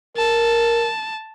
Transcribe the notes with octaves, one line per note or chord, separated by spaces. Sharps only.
A#4 A5